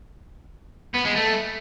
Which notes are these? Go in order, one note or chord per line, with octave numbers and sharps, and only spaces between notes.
B3
G#3
A3